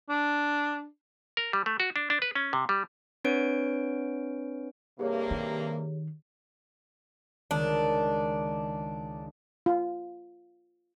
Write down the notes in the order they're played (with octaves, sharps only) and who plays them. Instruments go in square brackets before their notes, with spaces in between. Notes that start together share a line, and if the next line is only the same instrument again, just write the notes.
[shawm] D4
[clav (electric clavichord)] A#4
G3
A3
F#4
D4
D4
B4
C#4
C3
G3
[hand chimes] C4 D4 B4 C#5 D7
[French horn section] G2 C3 A#3 [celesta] G4 G#4 C#5
[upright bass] D#3
[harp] C#2 D#3 [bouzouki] D4
[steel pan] F4